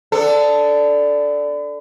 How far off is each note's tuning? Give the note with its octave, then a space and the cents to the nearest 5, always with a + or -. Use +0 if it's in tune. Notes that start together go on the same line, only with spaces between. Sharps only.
B3 +40 D4 +0 A4 +0